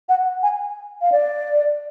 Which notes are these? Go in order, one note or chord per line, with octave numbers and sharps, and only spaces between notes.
F#5
G#5
F5
D5